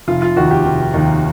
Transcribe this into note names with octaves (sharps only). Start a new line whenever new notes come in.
F1 F4
F4
D#2 D#3 F#4
G4
F1
D#2 D#3